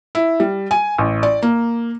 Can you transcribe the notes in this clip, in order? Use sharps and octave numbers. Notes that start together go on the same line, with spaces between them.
E4
G3
G#5
A1
D5
A#3